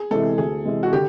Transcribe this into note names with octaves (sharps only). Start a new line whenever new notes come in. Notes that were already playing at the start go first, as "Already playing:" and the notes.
Already playing: G#4
C3 E3 G#3 A4
D2 G#4
C3 E3 G#3
F#4
D3 G4